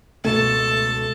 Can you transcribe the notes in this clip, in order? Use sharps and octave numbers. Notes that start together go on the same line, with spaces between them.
C#2 B2 A3 A4 A5